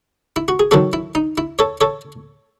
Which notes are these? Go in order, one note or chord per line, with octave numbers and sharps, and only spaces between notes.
E4
F#4
G#4
D#3 F#3 C4 F#4 A4
E4
D#4
E4
A4 C#5
A4 C#5